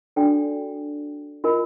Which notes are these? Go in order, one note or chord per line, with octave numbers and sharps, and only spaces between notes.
D4 F#4 A4 D5 G5
F4 A#4 D#5 G#5 B5